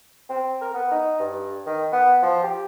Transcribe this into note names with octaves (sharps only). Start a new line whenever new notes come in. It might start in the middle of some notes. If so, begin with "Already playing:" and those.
C4
A#4
B3
D#4
G2
D#3
B3
F3
G4